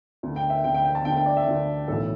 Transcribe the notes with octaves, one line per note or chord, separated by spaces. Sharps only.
D2 D3
G5
E5
D2 D3 G5
G5
G5
A5
D2 D3 G5
G5
D5
E5
D2 D3
B1 A2 E3 A4